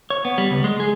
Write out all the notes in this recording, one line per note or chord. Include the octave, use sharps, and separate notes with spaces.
C#5
B3
G3
C#2
G#3
G#4